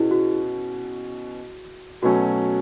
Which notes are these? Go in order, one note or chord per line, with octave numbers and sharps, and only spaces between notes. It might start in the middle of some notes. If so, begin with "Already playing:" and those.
Already playing: B2 C#4 E4 F#4 G#4
F#4
B2 F#3 A3 C#4 F#4